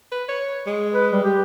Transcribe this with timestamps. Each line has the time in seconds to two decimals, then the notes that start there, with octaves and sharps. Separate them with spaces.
0.12 B4
0.29 C#5
0.67 G#3
0.93 B4
1.13 G3
1.24 G4